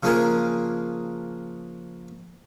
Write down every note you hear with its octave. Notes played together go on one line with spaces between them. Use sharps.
C#3 F3 A#3 D4 G#4 A#4